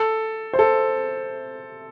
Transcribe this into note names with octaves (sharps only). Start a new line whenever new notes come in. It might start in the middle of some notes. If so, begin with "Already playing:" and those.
Already playing: A4
C5
A4